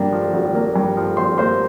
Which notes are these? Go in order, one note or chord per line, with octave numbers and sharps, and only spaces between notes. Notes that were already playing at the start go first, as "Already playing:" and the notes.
Already playing: G#1 G2 A#3 D4
F3
G#1
A#3
G2
F3
G#1 C5 C6
A#3 C5 C6